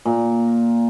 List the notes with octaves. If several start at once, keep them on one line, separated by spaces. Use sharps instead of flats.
A#2